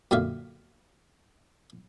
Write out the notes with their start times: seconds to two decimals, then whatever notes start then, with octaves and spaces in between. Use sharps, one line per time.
0.11 F#2 A#2 D3 E5 F5